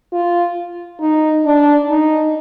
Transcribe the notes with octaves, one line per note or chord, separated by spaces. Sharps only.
F4
D#4
D4
D#4